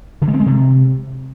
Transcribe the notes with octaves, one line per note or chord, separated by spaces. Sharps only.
D3
G#3
C4
G#3
C3